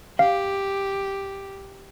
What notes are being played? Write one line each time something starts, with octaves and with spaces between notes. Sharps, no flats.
G4 F5